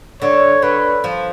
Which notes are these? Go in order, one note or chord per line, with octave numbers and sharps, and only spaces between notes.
D3 C#5
D3 B4
F3